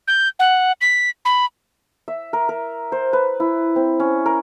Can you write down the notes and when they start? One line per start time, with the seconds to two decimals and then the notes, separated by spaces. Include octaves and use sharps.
0.08 G6
0.39 F#5
0.81 B6
1.25 B5
2.08 E5
2.33 A#4
2.49 A#4
2.92 C5
3.13 B4
3.40 E4
3.76 C4
4.00 C#4
4.26 A#4